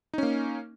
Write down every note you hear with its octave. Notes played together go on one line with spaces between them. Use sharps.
A#3 C#4 D#4